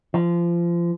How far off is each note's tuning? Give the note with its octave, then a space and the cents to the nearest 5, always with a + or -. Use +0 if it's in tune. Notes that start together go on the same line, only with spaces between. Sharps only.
F3 -25